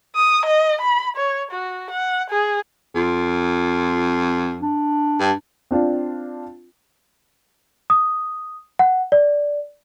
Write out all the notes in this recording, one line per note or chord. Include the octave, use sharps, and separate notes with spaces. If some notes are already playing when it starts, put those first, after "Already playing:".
D#6
D#5
B5
C#5
F#4
F#5
G#4
F2 F4
D4
G2
C4 D4 F4
D#6
F#5
D5